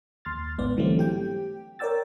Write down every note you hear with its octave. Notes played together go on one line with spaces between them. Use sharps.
D#2 C6 F6 A6
A1 G#2 B3 D5
D3 E3 F#3 G3 A3 C4
G4 G5
A#4 C#5 D5 G5 E6 A6